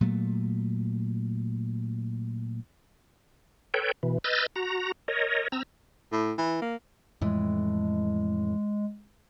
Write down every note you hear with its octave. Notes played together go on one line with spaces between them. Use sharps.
A#2 F#3 A3
A4 B4 C#5 G5
B2 E3
B4 D#5 E6 F6 G6 A6
F#4 A#5
A#4 C#5 D#5
C4 A#5 E6
A2
E3
A#3
F2 A2 E3 G#3